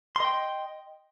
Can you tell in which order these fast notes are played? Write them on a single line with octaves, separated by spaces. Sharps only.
C6 D#5 G5